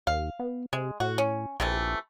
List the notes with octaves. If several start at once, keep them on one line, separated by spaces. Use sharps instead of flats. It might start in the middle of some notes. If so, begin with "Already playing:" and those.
D#2 F5
B3
C3 G#3
A2 F#4
C#4
A#1 C3 E3 A3